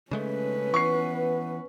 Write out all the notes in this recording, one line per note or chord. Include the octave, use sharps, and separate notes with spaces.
C#3 G#3 A3 C#4 B4
E3 B3 C#6 C7